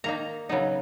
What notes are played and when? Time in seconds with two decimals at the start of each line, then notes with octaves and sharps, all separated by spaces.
0.04 D#3 A#3 D#4 A#5
0.49 C#3 F#3 B3 D#4